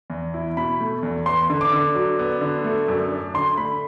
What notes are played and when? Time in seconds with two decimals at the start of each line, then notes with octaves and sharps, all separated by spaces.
0.10 E2
0.34 E4
0.57 B2 B5
0.80 A3
1.03 E2
1.26 B3 C6
1.50 D3
1.61 D6
1.73 D3
1.95 F#3
2.19 B3
2.41 D3
2.64 A3
2.88 F#2
3.12 D4
3.34 D3 C6
3.57 A3 B5